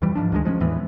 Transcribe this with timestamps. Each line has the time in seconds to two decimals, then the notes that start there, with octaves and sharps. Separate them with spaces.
0.02 F2 E3 G3
0.15 G#2 F3 D4
0.32 D2 D#3 F3 G#3
0.45 F3 G#3 B3 C#4
0.60 E2 A2 E3 B3